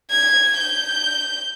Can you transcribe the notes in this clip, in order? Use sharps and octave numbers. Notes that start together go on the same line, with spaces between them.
G#6
G6